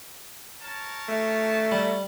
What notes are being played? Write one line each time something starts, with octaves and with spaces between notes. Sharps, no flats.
A#4 C#5 A5
A3
G3